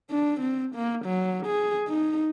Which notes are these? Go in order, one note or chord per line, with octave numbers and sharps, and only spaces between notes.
D4
C4
A#3
F#3
G#4
D#4